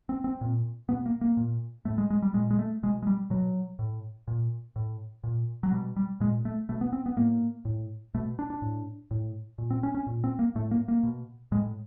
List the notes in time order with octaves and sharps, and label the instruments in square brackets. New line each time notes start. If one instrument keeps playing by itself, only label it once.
[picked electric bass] C4
C4
A#2
B2 B3
A#3
A#3
A#2
A2 A3
G#3
G#3
G3
A#2 G#3
G#3
A3
B2 G#3
G#3
G3
B2 F#3
A2
A#2
A2
A#2
F#3
B2 G3
G3
A#2 G#3
A3
B2 A3
B3
C4
B3
A2 A#3
A2
B2 A3
D4
D4
A2
A2
A#2
C4
C#4
C#4
A#2
C4
A#3
A2 A3
A#3
A#3
B2
A2 G#3